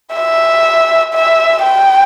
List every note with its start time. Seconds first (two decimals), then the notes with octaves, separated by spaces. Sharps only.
0.15 E5
1.14 E5
1.63 G5